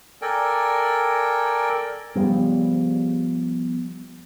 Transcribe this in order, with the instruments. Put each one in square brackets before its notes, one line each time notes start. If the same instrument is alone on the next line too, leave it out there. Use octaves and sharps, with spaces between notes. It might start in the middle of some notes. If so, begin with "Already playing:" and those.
[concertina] A4 A#4 D5 G5 G#5
[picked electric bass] C#3 F3 G3 B3